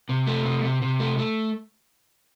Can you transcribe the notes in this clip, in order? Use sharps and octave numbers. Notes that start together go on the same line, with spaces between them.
C3
A3
C3
C3
C3
A3
A3